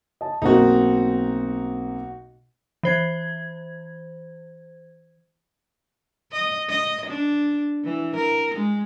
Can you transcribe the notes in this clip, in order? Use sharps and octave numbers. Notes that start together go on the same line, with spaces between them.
D#5 A5
B1 A#3 C4 D#4 F#4
E3 C5 G#6
D#5
D#5
D4
E3
A#4
G#3